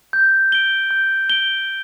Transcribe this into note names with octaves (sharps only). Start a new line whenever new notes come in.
G6
D7 G7
G6
D7 G7